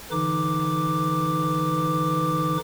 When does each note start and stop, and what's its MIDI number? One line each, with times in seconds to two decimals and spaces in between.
0.11 2.57 50
0.11 2.57 52
0.11 2.57 63
0.11 2.57 71
0.11 2.57 86